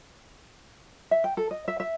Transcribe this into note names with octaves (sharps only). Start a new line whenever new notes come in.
E5
G5
A4
D#5
E5
E5